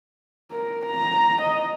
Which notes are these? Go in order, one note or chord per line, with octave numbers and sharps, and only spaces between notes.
A#4
A#5
D#5